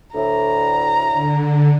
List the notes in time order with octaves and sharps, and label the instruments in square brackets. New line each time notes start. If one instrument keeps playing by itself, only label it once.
[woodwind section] D2 A2 [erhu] A#5
[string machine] D3